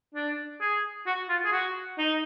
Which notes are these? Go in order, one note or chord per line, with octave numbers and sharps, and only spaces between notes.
D4
G#4
F#4
F4
G#4
F#4
D#4